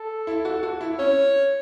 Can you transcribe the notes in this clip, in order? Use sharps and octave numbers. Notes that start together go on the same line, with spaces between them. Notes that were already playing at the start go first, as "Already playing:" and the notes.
Already playing: A4
E4
F#4
F#4
E4
C#4 C#5